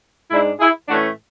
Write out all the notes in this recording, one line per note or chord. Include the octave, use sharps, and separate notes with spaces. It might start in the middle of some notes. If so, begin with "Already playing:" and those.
G#2 G#3 D4 E4
E4 G#4
A2 E3 A3 C#4 D4 F#4